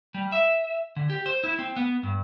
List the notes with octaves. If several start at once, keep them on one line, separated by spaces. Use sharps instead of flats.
G3
E5
D3
G4
C5
E4
C4
B3
G2